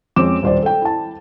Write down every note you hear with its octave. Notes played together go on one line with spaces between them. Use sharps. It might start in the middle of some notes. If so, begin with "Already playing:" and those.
F2 G#3 C4 C#4 D6 E7
D#1 C5 D5
A4 G5
E4 A5